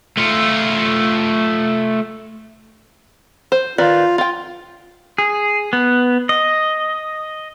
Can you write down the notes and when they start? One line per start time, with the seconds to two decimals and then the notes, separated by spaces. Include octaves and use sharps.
0.17 A3 F4
3.52 C5
3.78 D#3 F4 B4 D5
4.18 F4 G5
5.18 G#4
5.73 B3
6.29 D#5